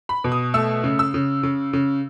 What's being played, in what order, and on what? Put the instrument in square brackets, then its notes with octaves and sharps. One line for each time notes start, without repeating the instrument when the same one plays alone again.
[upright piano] B5
B2
D#6
A3 E6
C#3
E6
C#3
C#3
C#3